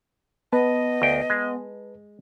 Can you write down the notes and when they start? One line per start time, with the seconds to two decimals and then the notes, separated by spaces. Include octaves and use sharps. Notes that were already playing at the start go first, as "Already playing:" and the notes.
0.52 B3 B4 D#5 A5
1.02 D2 G5
1.30 G#3